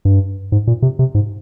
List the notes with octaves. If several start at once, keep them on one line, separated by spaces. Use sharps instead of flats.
G2
G#2
A#2
C3
C3
G#2